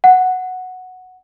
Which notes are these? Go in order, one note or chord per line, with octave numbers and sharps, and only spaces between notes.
F#5